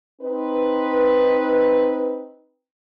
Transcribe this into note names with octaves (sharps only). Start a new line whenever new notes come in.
C4 D#4 B4